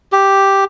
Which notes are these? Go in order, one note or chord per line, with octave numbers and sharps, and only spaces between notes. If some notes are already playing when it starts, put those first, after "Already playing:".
G4